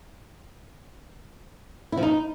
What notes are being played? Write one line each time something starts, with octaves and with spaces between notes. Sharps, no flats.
E4
F3
D#4